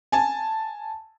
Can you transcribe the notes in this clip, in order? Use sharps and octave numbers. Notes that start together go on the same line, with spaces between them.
G#5 A5